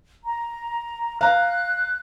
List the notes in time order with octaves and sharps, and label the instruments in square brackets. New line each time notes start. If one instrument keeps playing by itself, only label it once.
[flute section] A#5
[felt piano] F5 A#5 [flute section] F#6